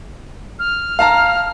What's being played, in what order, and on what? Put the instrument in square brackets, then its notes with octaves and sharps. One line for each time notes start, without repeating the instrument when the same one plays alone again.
[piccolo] F6
[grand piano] F5 A5 A#5